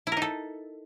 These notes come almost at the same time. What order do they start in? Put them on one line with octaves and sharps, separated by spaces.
E4 A#4 D#4 A4